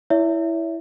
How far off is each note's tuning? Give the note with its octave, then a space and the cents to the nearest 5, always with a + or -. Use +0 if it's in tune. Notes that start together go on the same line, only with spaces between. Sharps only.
E4 +0 C#5 +35 E5 +0